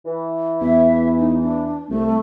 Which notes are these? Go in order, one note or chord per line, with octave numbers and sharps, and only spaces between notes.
E3
E2 E5
D#4
D4
C2 A3